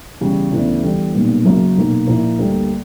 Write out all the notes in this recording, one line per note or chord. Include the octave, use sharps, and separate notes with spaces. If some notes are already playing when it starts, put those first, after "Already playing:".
E2 C#3 G3
D2 C#3 E3 B3 D4
E2 D3 G3
B1 A#2 G3 B3
F#2 C#3 F#3 A#3
B1 A#2 A#3
A#1 A#2 A#3 E4
D2 D3 G3 A#3